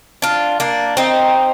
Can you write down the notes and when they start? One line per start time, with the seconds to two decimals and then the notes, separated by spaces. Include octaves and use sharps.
0.22 D4 F4
0.60 A#3 D4
0.97 C4 D#4